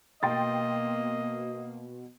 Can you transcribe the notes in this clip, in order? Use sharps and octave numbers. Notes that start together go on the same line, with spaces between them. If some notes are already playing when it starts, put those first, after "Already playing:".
B2 A#3 D#5 G5 C6 A6